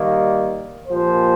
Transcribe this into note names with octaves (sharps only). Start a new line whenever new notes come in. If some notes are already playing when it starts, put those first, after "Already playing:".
Already playing: D#3 G3 A#3
A#2 F3 A#3 G4 C5